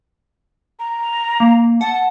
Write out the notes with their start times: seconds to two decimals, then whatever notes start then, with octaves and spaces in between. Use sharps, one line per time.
0.79 A#5
1.40 A#3
1.81 F#5 A5
1.93 A5